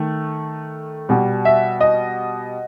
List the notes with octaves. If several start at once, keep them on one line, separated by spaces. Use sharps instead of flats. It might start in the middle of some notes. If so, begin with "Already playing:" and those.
Already playing: D#3 A3
B2 G3
E5
D#5